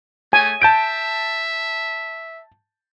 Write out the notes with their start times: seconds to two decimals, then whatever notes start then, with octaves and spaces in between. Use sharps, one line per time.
0.33 A3 G#5
0.62 E5 A5 G6 D7